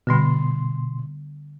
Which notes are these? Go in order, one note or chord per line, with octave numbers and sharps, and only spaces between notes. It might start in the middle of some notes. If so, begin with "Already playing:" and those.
B2 D3 G3 B3 C6